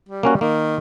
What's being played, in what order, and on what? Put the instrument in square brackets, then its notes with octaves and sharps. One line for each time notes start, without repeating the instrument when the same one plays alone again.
[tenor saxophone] G3
[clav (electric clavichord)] A#3 C#4 F#4
[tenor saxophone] D#3 [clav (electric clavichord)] A#3